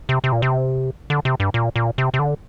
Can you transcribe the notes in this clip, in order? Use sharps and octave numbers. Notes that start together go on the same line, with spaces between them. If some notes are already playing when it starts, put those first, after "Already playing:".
C3
C3
A#2
C3
D3
C3
G2
A#2
A#2
C3
C3
D3